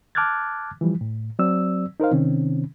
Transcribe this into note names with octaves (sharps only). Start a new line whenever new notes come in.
A5 D6 F6 F#6 G#6 A6
E3 F3 G3
A2
F#3 C4 D5 E6
D#4 A#4 C5 F5
C3 D#3 C4 C#4